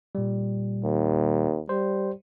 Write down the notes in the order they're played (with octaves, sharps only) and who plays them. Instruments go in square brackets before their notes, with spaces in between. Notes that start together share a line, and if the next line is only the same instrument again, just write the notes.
[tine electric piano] A#2 G3
[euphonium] D#2
[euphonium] G3 [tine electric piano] C5